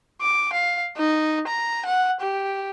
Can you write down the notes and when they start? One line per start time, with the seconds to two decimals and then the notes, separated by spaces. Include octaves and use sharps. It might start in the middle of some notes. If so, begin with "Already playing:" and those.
0.22 D6
0.53 F5
0.97 D#4
1.48 A#5
1.85 F#5
2.21 G4